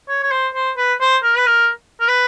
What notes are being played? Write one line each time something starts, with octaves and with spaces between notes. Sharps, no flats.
C#5
C#5
C5
C5
B4
C5
A#4
B4
A#4
A#4
B4